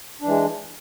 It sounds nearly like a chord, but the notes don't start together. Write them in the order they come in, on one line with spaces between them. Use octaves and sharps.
D4 E3 G#3